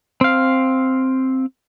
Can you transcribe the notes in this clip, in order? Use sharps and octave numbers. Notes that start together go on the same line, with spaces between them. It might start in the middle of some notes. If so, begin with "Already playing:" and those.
C4 F5